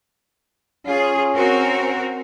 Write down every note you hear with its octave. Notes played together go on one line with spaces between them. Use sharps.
C#4 F4 G#4
C4 F#4 A#4